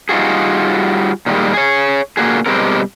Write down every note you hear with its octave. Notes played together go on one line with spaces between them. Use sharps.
G3 D#4 F4 F#4 G#4
A#2 D#3 E3 G3 G#3
G#4 C#5
A#2 D3 A#3 C#4 F#4 G#4
B2 G3 G#3 C4 A#4